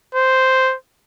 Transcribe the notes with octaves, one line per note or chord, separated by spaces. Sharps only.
C5